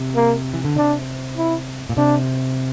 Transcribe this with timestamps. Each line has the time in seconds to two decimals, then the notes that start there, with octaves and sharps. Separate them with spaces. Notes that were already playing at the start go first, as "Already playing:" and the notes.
Already playing: C3
0.15 A#3
0.54 E3
0.65 D3
0.75 C3 D4
1.37 E4
1.89 A#2
1.97 C3 D4